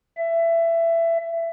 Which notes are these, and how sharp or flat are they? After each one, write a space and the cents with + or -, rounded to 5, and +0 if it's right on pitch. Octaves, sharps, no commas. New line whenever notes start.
E5 +20